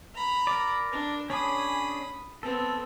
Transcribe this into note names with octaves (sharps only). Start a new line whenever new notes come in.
A#5 B5
A#4 D5
D4
C#4 D4 G#4 B5 D#6
B3 C4 A4